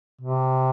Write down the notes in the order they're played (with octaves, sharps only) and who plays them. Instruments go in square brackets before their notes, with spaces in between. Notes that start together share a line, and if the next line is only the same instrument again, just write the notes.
[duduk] C3